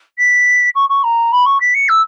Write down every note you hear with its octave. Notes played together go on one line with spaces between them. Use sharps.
B6
C#6
C#6
A#5
B5
C#6
B6
C#7
E6